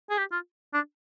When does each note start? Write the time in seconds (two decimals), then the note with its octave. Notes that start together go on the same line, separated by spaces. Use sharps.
0.10 G#4
0.18 G4
0.32 F4
0.74 D4